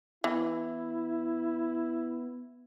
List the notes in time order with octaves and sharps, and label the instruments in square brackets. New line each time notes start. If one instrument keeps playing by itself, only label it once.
[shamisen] E3 [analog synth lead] B3 [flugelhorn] E4